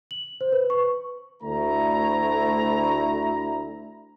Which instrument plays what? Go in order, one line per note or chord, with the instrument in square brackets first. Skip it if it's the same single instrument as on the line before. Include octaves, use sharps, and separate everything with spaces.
[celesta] F#7
C5
B4
C#6
[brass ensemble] D2 A3 E4 A#5